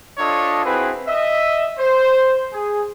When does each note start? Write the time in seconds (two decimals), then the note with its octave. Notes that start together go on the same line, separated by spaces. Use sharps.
0.18 D4 F4 A4 C#5 D#5
0.64 C4 E4 F#4 G#4 B4
1.07 D#5 E5
1.79 C5
2.52 G#4